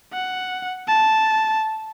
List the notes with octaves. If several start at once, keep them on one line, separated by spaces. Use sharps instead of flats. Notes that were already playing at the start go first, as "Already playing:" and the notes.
F#5
A5